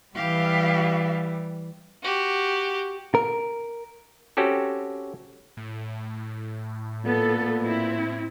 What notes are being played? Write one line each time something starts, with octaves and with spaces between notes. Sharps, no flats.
E3 G3 G4 F5
F#4 G4
A#4
C4 C#4 F#4 G4 A4
A2
A#2 B3 A4
C4 E4